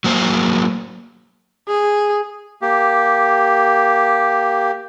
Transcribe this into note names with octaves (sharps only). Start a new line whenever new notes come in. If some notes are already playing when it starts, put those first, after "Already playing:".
F#3 A#3 C5
G#4
A#3 G4